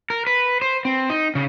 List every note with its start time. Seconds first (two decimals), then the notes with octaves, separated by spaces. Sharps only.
0.10 A#4
0.27 B4
0.62 C5
0.85 C4
1.10 D#4
1.35 C#3